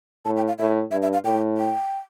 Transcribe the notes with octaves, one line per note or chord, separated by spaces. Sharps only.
A2 A5
G5
F5
A2 E5
G2 E5
E5
F5
A2 G5
G5